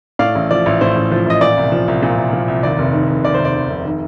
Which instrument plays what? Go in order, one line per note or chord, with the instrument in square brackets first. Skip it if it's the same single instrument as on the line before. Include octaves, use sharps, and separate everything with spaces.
[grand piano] A2 D5 F5
A1
F3 D5
A1
A2 C5
A1
F3
A1 D#5
A#2 D5
C2
F3
C2
A#2
C2
F3
C2
D#2 D5
F1
D#3
F1
D#2 D5
C5
F1
D5
D#3
F1
D#3